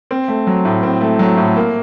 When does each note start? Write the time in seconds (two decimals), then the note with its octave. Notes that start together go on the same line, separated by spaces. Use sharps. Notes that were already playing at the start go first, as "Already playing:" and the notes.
0.11 C4
0.28 A3
0.47 F#3
0.65 A2
0.83 C4
1.01 A3
1.19 F#3
1.37 A2
1.56 A#3